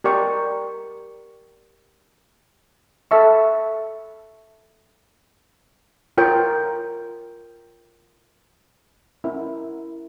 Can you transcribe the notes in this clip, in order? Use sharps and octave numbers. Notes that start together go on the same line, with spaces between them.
G4 A#4 D5 G5 C#6
A4 E5 A5 C#6
F4 A#4 C#5 G5
C#4 E4 A#4